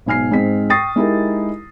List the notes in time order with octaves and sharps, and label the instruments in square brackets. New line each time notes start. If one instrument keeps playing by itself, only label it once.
[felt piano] B1 G#2 G#5 F6 C7
G#2 G#3 C4 B6
G5 C#6 D#6 A6 A#6 C7
G#3 D#4 E4 G4 A#4